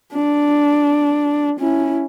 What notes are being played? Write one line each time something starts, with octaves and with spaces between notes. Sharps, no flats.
D4
C#4 E4